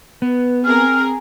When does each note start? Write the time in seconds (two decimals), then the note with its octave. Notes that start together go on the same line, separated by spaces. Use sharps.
0.22 B3 B4
0.65 C4 G#4 A#4 F6